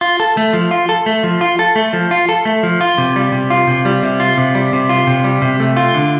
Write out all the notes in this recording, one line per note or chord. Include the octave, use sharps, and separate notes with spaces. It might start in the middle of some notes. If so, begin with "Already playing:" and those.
F4
A4
A3
F3
F4
A4
A3
F3
F4
A4
A3
F3
F4
A4
A3
F3
F4
C3
G3
C3
F4
C3
G3
C3
F4
C3
G3
C3
F4
C3
G3
C3
A3
F4
D3